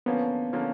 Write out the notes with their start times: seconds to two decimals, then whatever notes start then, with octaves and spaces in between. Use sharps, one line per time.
0.06 D3 F3 A#3 B3 C#4
0.53 D3 F3 A#3 C#4